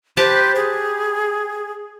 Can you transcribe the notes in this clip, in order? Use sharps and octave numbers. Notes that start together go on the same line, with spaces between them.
G4 B4 C5 A5
G#4